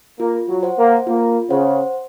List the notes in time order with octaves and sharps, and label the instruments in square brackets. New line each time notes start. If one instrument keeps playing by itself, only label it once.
[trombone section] A#3 [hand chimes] F4
[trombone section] F#3
[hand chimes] C5 F#5
[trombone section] A#3
[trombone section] A#3 [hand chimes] F4
[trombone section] C#3 [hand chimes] C5 F#5